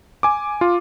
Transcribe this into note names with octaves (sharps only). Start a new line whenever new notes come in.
G#5 D6
F4